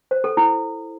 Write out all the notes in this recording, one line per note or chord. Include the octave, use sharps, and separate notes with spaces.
C5
A4
E4